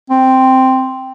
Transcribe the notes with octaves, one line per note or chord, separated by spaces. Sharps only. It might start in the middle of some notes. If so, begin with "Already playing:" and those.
C4